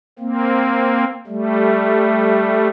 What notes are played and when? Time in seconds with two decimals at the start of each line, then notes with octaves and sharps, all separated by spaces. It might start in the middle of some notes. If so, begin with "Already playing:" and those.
0.19 A#3 C4
1.27 G3 A3